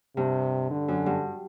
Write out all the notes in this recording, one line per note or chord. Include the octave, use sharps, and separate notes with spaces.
G2 C3
D3
F#2
G2